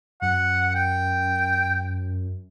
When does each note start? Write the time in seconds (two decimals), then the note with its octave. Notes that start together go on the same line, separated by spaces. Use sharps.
0.22 F#2 F#5
0.75 G5